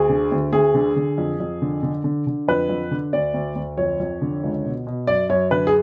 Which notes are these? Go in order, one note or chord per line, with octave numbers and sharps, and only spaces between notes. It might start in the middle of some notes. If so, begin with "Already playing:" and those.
Already playing: D2 G#4
D3
D2
D2 G#4
D3
D3
F2
F2
D3
D3
D3
D3
F2 B4
F2
D3
D2 D5
D2
D2
F2 C#5
F2
D3
C#2
B2
B2
F#2 D5
F#2 C#5
D3 B4
G#4